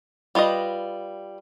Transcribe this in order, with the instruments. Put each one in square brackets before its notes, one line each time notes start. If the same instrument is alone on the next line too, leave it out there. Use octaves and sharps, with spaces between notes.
[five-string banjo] G3 F4 B4 D#5